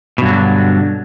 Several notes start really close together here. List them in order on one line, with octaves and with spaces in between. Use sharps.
B2 G2 F#3 D3